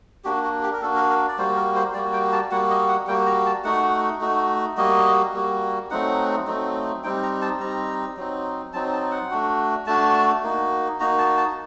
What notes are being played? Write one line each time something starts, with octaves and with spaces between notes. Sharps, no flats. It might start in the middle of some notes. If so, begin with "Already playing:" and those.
A#3 D4 F#4 G4
F#4
G4
A#4
A#3 D4 F#4 A4
A#4
A#4
D5
G3 A#3 F#4 C5
A#4
C5
G3 A#3 F#4 D5
G5
A5
G3 A#3 F#4 F#5
D#5
F#5
G3 A#3 F#4 G5
A#5
A5
A3 D#4 F#4 F#5
A3 D#4 F#4
G3 A#3 F#4 D#5
G3 A#3 F#4
F#3 A3 C4 D#4 F#5
F#3 A3 C4 D#4
G3 C4 D#4 G5
A#5
A5
G3 C4 D#4 A#5
F#3 C4 D#4
F#3 C4 D#4 A5
A5
F#5
A3 D4 F#4
A3 D4 F#4 A5
A#3 D#4 F#4
A#3 D#4 F#4 A#5
A5
A5